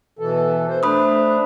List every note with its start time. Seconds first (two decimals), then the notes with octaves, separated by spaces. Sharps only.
0.19 B2 E3 A4
0.68 C5
0.83 A3 D4 C5 B5 D#6